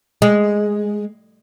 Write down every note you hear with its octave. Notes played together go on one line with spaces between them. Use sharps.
G#3